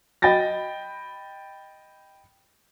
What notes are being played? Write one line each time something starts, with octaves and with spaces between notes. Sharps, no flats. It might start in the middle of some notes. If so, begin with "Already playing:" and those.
D#5 G5 B5 A6 A#6